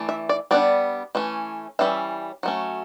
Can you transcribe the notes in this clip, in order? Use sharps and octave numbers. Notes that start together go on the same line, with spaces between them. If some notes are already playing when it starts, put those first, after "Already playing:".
Already playing: E3 A3 D4
E5
D5
G3 B3 D4 D5
E3 A3 C#4
E3 G3 C#4 E5
F#3 A3 C#4